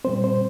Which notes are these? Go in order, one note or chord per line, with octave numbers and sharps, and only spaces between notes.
A#2 G3 C4 C5
C5